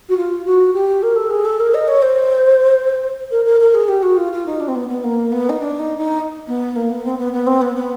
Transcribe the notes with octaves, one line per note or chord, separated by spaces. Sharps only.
F#4
F4
F#4
G4
A#4
A4
G#4
A4
A#4
D#5
C#5
C5
A#4
A#4
A#4
G#4
G4
F#4
F4
F4
D#4
D4
C4
B3
B3
A#3
B3
D#4
D4
D#4
D#4
B3
A#3
B3
C4
B3
B3
C4
B3
B3